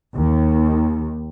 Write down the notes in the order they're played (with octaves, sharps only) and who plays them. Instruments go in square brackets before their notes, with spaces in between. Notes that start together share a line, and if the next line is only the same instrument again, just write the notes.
[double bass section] D#2